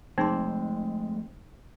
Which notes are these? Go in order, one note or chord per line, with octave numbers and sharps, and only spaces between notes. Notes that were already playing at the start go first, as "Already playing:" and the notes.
F3 G#3 A3 C4 D#4 G#4 C6